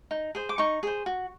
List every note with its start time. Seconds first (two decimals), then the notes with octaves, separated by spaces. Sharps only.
0.11 D#4
0.35 G#4 C5
0.49 D6
0.58 D#4 C#6
0.83 G#4 C5
1.06 F#4